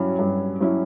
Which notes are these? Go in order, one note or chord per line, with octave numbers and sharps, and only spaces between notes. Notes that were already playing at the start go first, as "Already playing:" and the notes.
Already playing: G2 F#3 C#4 E4
G2
F#3 C#4 E4